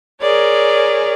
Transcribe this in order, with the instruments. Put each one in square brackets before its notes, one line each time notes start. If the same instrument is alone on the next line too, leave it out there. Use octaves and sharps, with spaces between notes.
[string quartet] G#4 A#4 C#5 D5